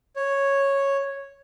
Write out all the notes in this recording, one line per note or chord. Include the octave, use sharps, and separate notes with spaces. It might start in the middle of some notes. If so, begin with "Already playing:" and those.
C#5